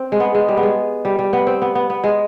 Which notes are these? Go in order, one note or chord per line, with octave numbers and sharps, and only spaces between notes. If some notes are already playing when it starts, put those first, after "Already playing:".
Already playing: C4
G#3
B3
G#3
G3
B3
G#3
G3
G3
B3
C4
B3
B3
B3
G#3